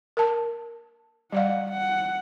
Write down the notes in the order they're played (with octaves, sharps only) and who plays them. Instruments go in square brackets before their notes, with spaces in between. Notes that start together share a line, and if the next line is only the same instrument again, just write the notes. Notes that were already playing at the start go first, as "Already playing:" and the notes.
[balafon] A#4 A5
[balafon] G3 D5 F5 [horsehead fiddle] F#5
[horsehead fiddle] F#5